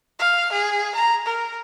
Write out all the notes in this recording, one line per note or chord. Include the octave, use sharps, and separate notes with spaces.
F5
G#4
A#5
A#4